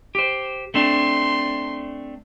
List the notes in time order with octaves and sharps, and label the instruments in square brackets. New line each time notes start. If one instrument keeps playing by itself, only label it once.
[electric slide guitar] G4 C5
[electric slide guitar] A3 C4 D4 [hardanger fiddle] C6